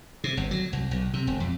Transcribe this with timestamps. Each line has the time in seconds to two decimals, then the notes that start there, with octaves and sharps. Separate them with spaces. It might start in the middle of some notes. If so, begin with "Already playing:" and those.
0.24 C3
0.37 G1
0.51 F#3
0.73 C2
0.91 B1
1.14 C3
1.27 E1
1.40 F2